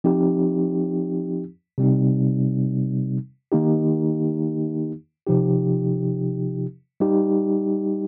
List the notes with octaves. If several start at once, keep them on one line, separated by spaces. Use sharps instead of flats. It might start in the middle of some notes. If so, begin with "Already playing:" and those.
F3 C4 D#4 G4
C3 G3 C4 D#4
D#3 A#3 D#4 G4
C3 F3 D#4 G4
G3 D#4 G4